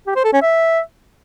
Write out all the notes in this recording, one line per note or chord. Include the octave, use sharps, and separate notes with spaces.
G4
C5
A4
C#4
E5